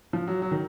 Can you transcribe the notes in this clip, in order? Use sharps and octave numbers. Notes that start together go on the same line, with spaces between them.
F3
F#3
F#3
D#3